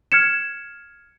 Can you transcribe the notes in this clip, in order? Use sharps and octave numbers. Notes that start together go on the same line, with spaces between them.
F6 G#6 C#7 E7